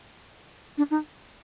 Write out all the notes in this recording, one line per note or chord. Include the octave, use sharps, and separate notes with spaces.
D4
D#4